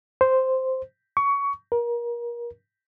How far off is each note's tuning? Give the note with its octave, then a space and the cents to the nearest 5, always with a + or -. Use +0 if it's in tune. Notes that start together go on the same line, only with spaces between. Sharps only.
C5 -5
C#6 +20
A#4 +30